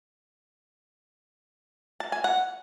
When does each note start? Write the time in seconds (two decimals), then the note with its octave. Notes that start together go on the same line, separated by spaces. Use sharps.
2.00 A5
2.12 G#5
2.24 F#5